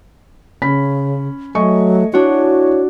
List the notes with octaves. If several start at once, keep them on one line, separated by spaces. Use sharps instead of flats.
C#3 C#4 B5 B6
F#3 A3 D#5 G#5 C#6
D4 E4 F#4 C#5